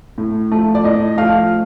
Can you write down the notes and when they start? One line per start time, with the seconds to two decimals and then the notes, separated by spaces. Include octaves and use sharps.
0.18 A2
0.52 F3 A3
0.75 D5
0.84 A2 D#5
1.18 F3 A3 F5